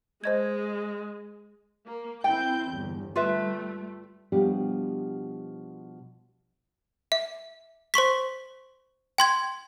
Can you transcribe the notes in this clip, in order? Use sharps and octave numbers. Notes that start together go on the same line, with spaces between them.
G#3 C5 D#5 G#6
A#3
C4 E4 G5 G6
G1 E2
G3 A3 F4 B4 E5
B2 F3 G3 D4 G4
E5
C5 C6 C#6 B6
G5 C6 G#6